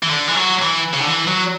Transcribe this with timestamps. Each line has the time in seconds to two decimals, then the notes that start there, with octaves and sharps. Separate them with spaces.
0.03 E3
0.09 D3
0.28 E3
0.35 F#3
0.62 E3
0.94 C#3
1.01 D3
1.08 E3
1.28 F#3